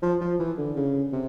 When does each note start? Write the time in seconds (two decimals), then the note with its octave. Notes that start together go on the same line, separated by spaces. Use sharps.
0.02 F3
0.21 F3
0.39 E3
0.58 D3
0.76 C#3
1.12 C3